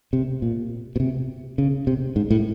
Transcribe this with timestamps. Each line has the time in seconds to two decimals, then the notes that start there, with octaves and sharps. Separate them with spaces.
0.13 C3
0.42 A#2
0.96 B2
1.00 C3
1.58 C#3
1.87 C3
2.16 G#2
2.31 A2